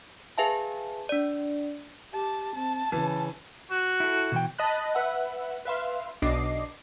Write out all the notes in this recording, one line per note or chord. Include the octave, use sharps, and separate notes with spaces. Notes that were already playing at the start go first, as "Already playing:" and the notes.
G#4 B4 E5 F5 G#5 A5
D4 D5
G4 A5
C4 A5
C#3 E3
F#4
E4 A4
B2 E3 G5
D#5 A5 B5 F#6
B4 E5 F#5
B4 E5 F5 C6
B1 B2 D4 D#5 D6 C7